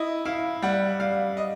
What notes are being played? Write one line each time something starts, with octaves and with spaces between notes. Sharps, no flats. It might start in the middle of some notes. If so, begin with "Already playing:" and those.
Already playing: E4 D#5
E4 F5
G3 F#5
G3 F5
D#5